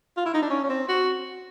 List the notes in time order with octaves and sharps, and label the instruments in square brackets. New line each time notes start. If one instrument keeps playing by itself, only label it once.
[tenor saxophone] F4
E4
D#4
D4
C#4
C#4
C4
F#4